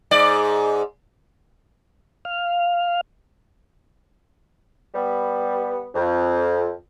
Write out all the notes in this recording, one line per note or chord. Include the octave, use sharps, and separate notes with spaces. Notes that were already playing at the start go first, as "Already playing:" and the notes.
G#2 D5
F5
G3 B3
F2